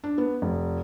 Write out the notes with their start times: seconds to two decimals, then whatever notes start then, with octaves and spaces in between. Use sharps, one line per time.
0.04 D4
0.18 B3
0.42 F1